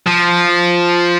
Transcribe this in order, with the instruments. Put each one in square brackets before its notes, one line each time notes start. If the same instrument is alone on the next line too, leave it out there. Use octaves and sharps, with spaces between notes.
[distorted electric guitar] F3